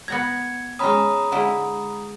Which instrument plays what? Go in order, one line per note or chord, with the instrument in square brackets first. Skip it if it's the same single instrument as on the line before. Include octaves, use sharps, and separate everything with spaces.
[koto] B3 F#5 A#5 [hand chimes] G#6 C#7
[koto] G#3 C#4 [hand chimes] A#5 B5 D#6
[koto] D3 G#3 E4